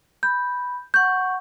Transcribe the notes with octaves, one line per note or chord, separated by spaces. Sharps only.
B5 G6
F#5 C#6 G6